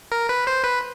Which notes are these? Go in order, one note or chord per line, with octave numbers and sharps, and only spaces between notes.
A#4
B4
C5
B4